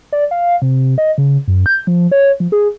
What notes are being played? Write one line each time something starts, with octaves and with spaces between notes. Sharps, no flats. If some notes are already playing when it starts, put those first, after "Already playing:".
D5
F5
C3
D#5
C#3
F#2
G6
F3
C#5
F3
G#4